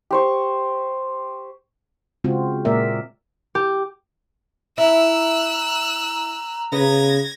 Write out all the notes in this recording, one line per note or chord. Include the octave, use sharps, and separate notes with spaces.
G4 C5 C#6
C#3 G#3 C4 F4 F#4
A#2 G#3 A#3 A#4 D5 E5
G4
E4 A#5 E6 F#6
C#3 B3 G#6 A#6